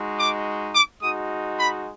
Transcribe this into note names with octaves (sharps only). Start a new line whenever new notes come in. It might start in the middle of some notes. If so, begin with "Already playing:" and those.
Already playing: G#3 D#4 F#4
D6
D6
G#3 D#4 F#4 D#6
B5